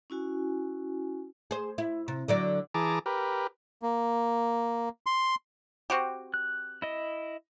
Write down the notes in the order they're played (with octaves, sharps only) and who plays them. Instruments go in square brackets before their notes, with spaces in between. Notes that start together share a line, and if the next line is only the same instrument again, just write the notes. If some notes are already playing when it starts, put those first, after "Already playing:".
[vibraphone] C#4 E4 F#4 G#5
[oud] G#4 C5
E4
C3
D3 F#3 D5
[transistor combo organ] E3 G#4 A5 A#5 D6
G4 A#4 B4
[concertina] A#3
C6
[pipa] C4 F#4 G4
[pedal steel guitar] F#6
E4 D#5